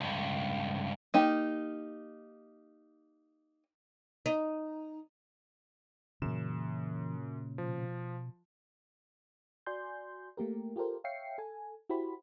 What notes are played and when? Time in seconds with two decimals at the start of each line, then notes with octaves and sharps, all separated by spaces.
0.01 C#2 G2
1.14 A#3 D#4 G4
4.26 D#4
6.22 F#2 A#2 C#3 E3 E7
7.58 B2 F3
9.66 F#4 D5 G#5 C6 G6
10.37 A3 A#3 G4 A#4
10.76 F4 G4 A4 A#4 C5
11.04 C#5 E5 F5 G5 C7 C#7
11.38 A4 G#5
11.90 E4 F#4 G4 C5 B5